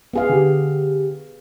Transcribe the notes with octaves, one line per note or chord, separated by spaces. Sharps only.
B3 G#4 F5
D3 G4